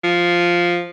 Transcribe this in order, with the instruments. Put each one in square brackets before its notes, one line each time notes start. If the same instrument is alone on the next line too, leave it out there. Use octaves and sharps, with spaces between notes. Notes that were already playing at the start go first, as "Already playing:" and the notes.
[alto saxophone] F3